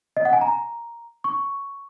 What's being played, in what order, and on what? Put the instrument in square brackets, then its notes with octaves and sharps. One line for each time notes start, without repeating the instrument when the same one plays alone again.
[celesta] D#5
F#5
G#5
A#5
C#6